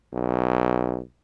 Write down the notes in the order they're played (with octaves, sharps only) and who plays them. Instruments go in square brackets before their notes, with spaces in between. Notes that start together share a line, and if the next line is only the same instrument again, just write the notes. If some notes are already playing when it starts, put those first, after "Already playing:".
[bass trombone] B1